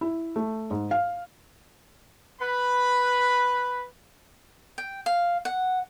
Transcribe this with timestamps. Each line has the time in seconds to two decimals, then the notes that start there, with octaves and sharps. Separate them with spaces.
0.01 E4
0.36 A3
0.71 G#2
0.91 F5
2.40 B4 B5
4.78 G5
5.06 F5
5.45 F#5